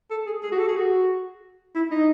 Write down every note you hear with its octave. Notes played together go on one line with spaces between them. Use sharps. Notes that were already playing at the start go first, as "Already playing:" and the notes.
A4
G#4
G#4
F#4
A4
G#4
F#4
E4
D#4